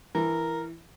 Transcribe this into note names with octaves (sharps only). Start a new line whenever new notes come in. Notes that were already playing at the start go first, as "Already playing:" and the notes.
E3 A#4